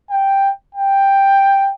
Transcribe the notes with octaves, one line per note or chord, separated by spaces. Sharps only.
G5
G5